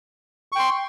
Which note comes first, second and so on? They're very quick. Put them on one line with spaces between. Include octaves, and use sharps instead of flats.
C#6 G5 C6